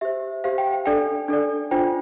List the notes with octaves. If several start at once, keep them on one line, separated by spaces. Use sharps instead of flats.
G4 C5 E5
G4 C5 F5
G5
G5
D4 A4 D5 G5
D4 A4 D5
D4 F4 C5 G5